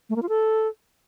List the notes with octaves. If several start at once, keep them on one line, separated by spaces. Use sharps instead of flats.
A3
A#3
F4
A4